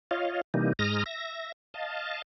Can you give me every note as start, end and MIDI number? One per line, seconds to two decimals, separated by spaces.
0.11 0.41 65
0.11 0.41 73
0.11 0.41 75
0.11 0.41 77
0.54 0.73 48
0.54 0.73 52
0.54 0.73 55
0.54 0.73 58
0.54 0.73 63
0.79 1.04 44
0.79 1.04 56
0.79 1.04 82
0.79 1.04 87
0.79 1.04 89
0.79 1.04 94
1.06 1.52 76
1.06 1.52 94
1.74 2.22 75
1.74 2.22 77
1.74 2.22 81